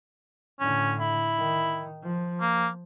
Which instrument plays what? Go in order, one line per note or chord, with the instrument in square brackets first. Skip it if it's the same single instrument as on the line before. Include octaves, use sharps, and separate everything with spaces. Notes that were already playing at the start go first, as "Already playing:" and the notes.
[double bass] A2 D3 [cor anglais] C#4
[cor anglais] E4
[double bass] D#3
F3
[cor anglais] A#3